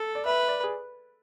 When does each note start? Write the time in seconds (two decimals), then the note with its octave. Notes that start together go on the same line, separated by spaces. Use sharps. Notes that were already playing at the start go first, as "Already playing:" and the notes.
Already playing: A4
0.15 D5
0.25 B4 E5
0.48 D5
0.64 G#4